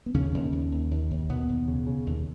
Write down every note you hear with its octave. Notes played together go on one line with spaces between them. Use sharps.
B3
D#2 C#3 C#4
D#2
D#2
D#2
D#2
D#2
D#2 B2 B3
D#2
C#3
C#3
D#2